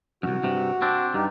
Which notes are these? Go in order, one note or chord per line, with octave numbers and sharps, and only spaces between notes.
C2 F#2 F#4
G2 C3
C4 D4
G2 D#4 G4